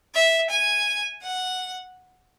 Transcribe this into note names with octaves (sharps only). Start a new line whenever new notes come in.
E5
G#5
F#5